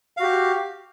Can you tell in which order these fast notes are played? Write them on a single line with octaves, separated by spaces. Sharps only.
F5 F#4 G4